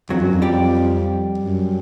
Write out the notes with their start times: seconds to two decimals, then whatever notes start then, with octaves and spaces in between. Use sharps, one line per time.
0.10 F2 F#3 F#4
0.21 F#2
0.33 F2
0.42 G3 G4
1.38 F#2